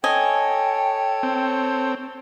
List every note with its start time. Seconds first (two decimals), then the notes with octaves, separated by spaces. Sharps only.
0.04 A4 C#5 D#5 G5 G#5
1.23 C4